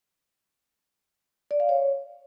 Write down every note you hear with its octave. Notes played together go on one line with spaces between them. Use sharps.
D5
F5
C#5